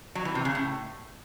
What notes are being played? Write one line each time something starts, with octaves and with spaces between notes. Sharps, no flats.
F#3
E3
C3
C#3
A2